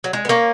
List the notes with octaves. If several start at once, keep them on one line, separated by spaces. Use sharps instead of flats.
F#3
G#3
B3
A#3 C#4